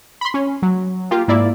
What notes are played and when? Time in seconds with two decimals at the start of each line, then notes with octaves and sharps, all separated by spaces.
0.21 B5 C6
0.34 C#4
0.62 F#3
1.11 A#3 F4 G4
1.28 G#2 A#3 E4 D5